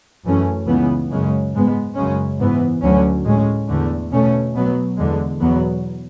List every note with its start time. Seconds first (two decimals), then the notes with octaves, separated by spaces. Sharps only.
0.24 F#2 E3 A3 C#4
0.67 C#2 C#3 E3 B3
1.10 F#2 C#3 G#3 C#4
1.53 G#2 G#3 B3
1.96 F#2 C#3 G#3 C#4
2.39 G#2 E3 B3
2.82 D2 D3 F#3 C#4
3.25 A2 G#3 C#4
3.68 E2 D3 A3
4.12 B2 A3 C#4
4.54 B2 F#3 B3
4.97 E2 D3 G#3
5.40 E2 B2 F#3 B3